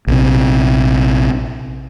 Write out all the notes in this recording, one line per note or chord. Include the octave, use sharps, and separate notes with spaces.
A#1 C3